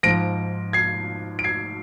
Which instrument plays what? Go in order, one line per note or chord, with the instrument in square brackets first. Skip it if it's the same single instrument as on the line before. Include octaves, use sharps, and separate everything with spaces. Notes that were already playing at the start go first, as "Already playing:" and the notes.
[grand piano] G#2 F3 A#6 D7
G#6 C7
D7
G#6 C7